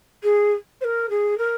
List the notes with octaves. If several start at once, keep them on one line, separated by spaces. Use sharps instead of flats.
G#4
C5
A#4
G#4
A#4